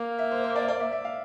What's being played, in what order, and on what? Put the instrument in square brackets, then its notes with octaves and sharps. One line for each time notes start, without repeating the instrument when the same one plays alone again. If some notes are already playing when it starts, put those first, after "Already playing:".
Already playing: [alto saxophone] A#3 [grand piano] F5
[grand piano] E5
C5
C5
D5
E5
D5
E5
E5
F5